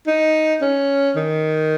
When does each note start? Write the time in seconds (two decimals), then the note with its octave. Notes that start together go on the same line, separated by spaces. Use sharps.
0.07 D#4
0.62 C#4
1.16 D#3